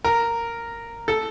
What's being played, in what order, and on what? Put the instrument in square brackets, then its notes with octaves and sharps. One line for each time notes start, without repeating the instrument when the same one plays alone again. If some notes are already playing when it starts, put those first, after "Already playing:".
[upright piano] A#4
A4